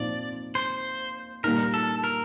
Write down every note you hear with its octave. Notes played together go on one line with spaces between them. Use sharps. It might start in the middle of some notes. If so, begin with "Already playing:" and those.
Already playing: A#2 F3 C4 D#4 D5
C5
A#2 G3 A#3 D#4 A#4
A4
A#4